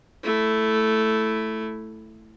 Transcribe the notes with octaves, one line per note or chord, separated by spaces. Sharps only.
A3 E4